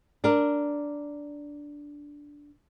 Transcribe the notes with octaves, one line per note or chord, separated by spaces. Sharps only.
D4 A#4